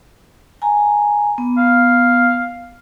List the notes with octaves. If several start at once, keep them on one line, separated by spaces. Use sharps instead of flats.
G#5 A#5
B3
F5